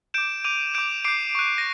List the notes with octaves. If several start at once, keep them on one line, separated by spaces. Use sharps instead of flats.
D6 G6 D7 E7
D6 G6 D#7 F7
D6 G6 D7 E7
D6 G6 C7 D7
C#6 F#6
A#6